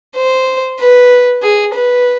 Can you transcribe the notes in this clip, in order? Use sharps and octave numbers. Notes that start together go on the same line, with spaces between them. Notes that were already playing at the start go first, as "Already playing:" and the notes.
C5
B4
G#4
B4